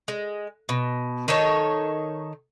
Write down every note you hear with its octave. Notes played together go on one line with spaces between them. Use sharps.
G#3
B2
D#3 D#4 A4 C#5